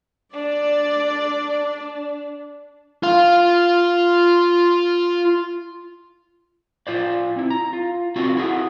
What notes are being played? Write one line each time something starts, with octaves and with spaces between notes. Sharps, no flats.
D4 D5
F4 F5
F4 C5 D5
C4 E4
A#5
F4
C4 D4 F4 F#4
E4 F#4 G#4